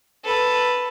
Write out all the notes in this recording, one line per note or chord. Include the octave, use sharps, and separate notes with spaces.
A4 B4